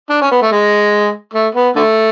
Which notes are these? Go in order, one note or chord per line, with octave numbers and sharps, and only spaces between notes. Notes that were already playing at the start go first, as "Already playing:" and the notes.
D4
C#4
B3
A3
G#3
A3
B3
D3 A3